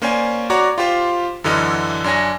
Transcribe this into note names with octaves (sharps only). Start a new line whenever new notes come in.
A#3 C#4 C5 D5 G#5
F#4 C#5 D5 A#5 D6
F4 G4 C5
F#2 D3 E3 D#5 F6
F#2 D4 C#5 G#5 A#6